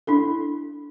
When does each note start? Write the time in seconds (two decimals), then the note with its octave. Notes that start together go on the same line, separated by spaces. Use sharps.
0.07 D4 E4 A4